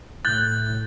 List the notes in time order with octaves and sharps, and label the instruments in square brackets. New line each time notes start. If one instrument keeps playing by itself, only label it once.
[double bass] A2 [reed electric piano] F#6 G6 [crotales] A6